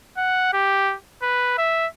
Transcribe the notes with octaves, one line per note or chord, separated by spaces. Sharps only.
F#5
G4
B4
E5